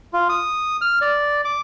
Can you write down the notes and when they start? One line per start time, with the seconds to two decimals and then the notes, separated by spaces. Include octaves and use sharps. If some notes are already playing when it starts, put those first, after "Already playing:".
0.13 F4
0.29 D#6
0.81 F6
1.02 D5
1.45 D6